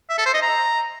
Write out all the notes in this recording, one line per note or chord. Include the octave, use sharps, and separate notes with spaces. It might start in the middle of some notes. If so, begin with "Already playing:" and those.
E5
A4
C5
D#5
A#5